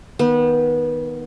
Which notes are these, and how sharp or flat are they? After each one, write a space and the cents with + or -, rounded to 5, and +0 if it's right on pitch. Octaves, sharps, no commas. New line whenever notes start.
D#3 +0 B3 -25